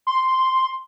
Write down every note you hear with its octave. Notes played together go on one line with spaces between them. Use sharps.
C6